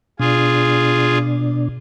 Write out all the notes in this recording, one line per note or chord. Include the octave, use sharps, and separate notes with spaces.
B2 D4 F4 G#4